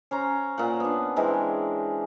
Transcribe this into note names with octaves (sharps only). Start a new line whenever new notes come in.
C#4 C5 A#5
A#2 A#3 F#5
B3 D4
E3 G#3 C4 A#4